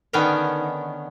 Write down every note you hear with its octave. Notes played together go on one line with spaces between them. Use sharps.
D3 D#3 B3 C#4 F5 G5